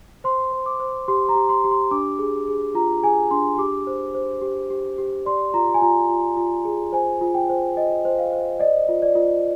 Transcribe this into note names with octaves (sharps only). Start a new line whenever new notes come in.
C5 C6
C5
D6
C5
G4 C6
A#5
G4
C6
G4
C6
D4 D6
G#4
G#4
F4 A#5
G#4 G#5
D4 C6
G4 D6
C5
C5
G4
G4
G4
D5 C6
F4 A#5
G#5
F4 A#5
F4
F4
G#4
C5 G#5
F4
G5
C5
C5 D#5
C5
F5
C5
D5 D#5
F4
D5
F4